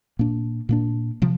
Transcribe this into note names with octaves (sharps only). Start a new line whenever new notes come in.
A#2 A#3 D4
A#2 A#3 D4
C3 F3